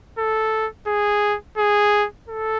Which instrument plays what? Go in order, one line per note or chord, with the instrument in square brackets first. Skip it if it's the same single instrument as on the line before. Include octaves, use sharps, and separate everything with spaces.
[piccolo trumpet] A4
G#4
G#4
A4